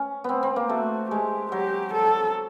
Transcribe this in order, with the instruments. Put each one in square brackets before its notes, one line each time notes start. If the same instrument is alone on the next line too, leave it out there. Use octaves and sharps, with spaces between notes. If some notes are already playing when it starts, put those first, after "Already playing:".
Already playing: [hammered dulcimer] C#4
B3 C4
C4
A#3
[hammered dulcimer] A3 [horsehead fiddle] F#4
[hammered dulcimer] G#3 [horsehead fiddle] G4
[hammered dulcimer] F#3 [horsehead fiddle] G4
[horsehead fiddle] A4